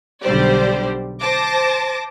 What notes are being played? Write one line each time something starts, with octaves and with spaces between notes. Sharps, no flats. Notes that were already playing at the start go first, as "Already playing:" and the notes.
B1 D3 G3 G4 C5 D5
C5 A5 D6 A#6